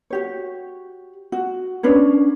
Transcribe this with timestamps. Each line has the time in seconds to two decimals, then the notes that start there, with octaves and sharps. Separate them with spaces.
0.10 F#4 G4 C#5
1.32 F#4
1.83 C#4 D4 B4 C#5